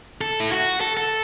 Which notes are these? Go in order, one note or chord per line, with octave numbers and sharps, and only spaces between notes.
A4
E4
F#4
A4
A4